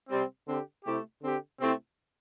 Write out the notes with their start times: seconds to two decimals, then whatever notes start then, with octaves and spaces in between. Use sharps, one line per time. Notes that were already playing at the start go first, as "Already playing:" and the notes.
0.09 C3 G3 C4
0.46 D3 C4 G4
0.84 C3 A3 E4 G4
1.21 D3 C4 G4
1.58 C3 A3 C4 E4